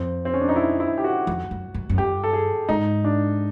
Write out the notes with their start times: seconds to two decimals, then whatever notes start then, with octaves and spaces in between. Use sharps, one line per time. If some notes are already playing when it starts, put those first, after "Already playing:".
Already playing: F2 C4
0.25 C4
0.34 C#4
0.41 D4
0.49 D#4
0.56 E4
0.80 E4
0.98 G4
1.04 F#4
1.27 F2
1.51 F#2
1.74 F#2
1.89 F#2
1.98 G2 G4
2.24 A4
2.33 G#4
2.69 G#2 D#4
3.04 D4